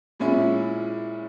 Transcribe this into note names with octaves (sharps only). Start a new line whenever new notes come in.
A#2 G#3 C#4 E4